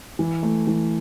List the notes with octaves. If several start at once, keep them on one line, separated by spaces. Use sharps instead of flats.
E3
A3
E3